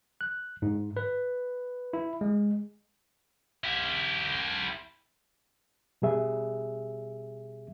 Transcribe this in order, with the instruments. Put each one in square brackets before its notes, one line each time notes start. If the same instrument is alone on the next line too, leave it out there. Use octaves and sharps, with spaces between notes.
[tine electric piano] F#6
G#2
B4
E4
G#3
[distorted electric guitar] E4 G4
[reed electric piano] B2 G3 G#4 E5